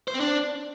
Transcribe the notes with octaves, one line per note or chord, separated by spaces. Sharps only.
C5
C4
D4